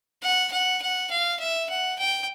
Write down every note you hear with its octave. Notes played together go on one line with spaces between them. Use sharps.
F#5
F#5
F#5
F5
E5
F#5
G5